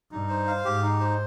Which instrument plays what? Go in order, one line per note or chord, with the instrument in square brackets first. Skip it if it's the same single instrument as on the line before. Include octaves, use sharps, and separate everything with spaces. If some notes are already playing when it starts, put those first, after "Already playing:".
[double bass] G2 [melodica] D#4
[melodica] C5
F5
[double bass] G#2 [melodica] G4
[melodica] D#4
C5